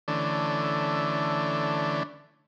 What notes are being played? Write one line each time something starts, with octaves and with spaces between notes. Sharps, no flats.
D3 E3 A3 C#4 D4